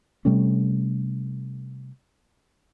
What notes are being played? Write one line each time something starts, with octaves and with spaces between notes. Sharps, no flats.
C3 G3 A3 C#4